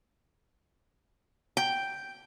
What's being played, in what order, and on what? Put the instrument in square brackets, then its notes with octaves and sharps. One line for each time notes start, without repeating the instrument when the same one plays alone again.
[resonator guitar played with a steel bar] G5